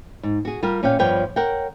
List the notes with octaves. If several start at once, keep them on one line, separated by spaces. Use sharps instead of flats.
G#2
F#4 G#4
G3 F4 G4 A#4
A#2 C#4 C#5 F5 G5
G2 F3 B3 C#5 G5
A#4 C#5 F#5 G5